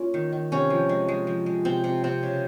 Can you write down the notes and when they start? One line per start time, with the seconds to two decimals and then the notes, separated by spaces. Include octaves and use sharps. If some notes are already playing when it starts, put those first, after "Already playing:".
Already playing: A#3 C#4 F4
0.14 D#3
0.33 D#3
0.52 C3 C#4
0.70 F3
0.89 G#3
1.08 G#3
1.27 F3
1.46 G#3
1.65 C3 C4
1.84 C3
2.04 C3 C4
2.23 C#3